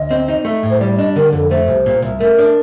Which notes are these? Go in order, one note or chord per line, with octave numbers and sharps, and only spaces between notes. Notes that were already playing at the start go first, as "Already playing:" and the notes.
Already playing: D2 D#5
C4
D#4
A3
A2
C5
G3 D5
D4 D#5
D3 A#4
F2 A4
A3 C5
C2
A#2
C2
A3 A#4
D4